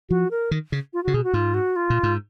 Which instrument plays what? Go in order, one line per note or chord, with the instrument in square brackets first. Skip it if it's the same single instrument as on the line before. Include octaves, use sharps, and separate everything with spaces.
[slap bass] F3 [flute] F#4
[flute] A#4
[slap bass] D#3
C#3
[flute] F4
[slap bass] C#3 [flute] F#4
[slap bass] B2 [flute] G#4
[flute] F#4
[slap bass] G#2 [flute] F4
[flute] F#4
F4
[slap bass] A#2
G#2